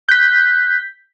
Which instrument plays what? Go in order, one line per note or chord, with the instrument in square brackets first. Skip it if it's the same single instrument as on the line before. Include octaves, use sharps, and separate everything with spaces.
[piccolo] F#6 [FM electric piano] G6 B6